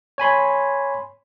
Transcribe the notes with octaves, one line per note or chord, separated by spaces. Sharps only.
C#5 G#5 B5 C6